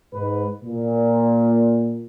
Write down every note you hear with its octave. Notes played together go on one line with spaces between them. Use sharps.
G#2 B4
A#2